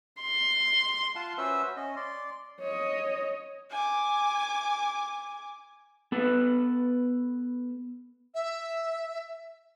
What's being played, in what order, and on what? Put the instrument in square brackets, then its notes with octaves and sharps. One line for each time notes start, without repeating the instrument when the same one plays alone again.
[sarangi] C6
[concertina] F4 F5 F#5 A5
C#4 F#4 B4 C5 E5 E6
C#4 D#5
D5 C6
[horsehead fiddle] C#5 D#5
[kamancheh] G#5 D6
[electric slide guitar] B3 A4 B4
[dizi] E5